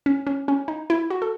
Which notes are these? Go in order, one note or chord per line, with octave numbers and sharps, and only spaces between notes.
C#4
C#4
C#4
D#4
E4
F#4
A4